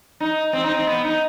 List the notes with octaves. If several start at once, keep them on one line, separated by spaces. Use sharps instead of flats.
D#4
C4
D#4
C4
B3
D#4